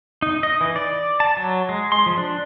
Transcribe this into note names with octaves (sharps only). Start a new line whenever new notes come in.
D#4
D#5
E3
D5
A5
F#3
G#3
C6
F3
D4